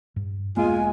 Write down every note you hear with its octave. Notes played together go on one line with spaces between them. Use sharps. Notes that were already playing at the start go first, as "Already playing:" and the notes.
G2
E1 G#3 A#3 B3 F4 G#5